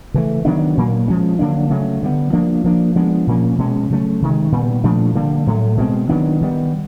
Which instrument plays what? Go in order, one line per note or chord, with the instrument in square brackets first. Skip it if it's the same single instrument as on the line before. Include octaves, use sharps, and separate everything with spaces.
[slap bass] C#3 E3 A3
D#3 F#3 B3 D4
A#2 F#3 A#3
F3 G#3 C#4
D3 F#3 A#3 D4
C#3 F#3 A3
D3 G3 B3
F3 A#3 D4
F3 A#3 D4
F3 G#3 B3 D4
A#2 F3 A#3 C#4
B2 G#3 C#4
C#3 F#3 A3 C#4
C3 D#3 G#3
A#2 G3 B3
A#2 F3 A3 D4
D3 G3 A#3
A2 F#3 A3
B2 G#3 C4
D#3 F#3 B3 D4
D#3 G3 B3